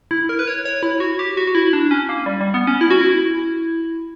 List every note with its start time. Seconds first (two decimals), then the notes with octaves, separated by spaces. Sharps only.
0.11 E4
0.29 A#4
0.39 B4
0.48 C#5
0.65 C#5
0.83 E4
1.00 F#4
1.19 G4
1.37 F#4
1.47 F#4
1.55 E4
1.73 D4
1.91 C#4
2.09 A#3
2.26 G3
2.41 G3
2.54 B3
2.67 C#4
2.81 E4
2.90 F#4
3.01 E4